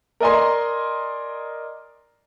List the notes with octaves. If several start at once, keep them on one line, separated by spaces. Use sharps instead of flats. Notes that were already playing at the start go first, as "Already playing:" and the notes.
A#4 D5 D#5 G#5 A#5 C6